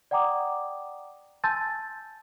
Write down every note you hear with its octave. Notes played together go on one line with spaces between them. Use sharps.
D5 F#5 G5 A#5 D6 D#6
G#5 A5 C6 E6 G6 A6